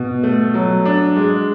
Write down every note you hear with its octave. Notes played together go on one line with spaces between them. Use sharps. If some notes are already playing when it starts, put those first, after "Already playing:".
Already playing: B2
A3
F#3
D4
G#3